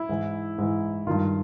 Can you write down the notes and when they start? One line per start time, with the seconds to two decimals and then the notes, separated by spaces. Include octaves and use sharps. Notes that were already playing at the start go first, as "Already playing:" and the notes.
Already playing: E4
0.09 G#2 E3
0.58 G#2 E3
1.07 G2 D#3 F4